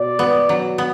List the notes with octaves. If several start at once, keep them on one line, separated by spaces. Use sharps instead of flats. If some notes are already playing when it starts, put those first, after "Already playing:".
Already playing: B2 D5
B3
F#3
B3